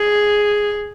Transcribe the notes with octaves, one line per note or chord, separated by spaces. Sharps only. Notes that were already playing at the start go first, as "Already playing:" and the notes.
Already playing: G#4